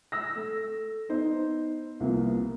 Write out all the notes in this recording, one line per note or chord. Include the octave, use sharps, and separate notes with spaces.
E6 A#6
A3
B3 D#4 C5
C2 F3 A#3 B3